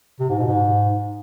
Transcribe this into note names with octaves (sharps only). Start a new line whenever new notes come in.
C3
G#2
B2
G#2